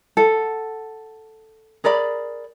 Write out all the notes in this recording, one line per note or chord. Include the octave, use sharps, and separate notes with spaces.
A4 F#5
G#4 A#4 D5 B5